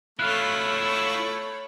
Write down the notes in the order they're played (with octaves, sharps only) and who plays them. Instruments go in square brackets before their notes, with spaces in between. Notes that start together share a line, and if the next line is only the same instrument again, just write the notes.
[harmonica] A3 [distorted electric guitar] E4 F4 [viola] C#5 B5 [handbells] F6 F#6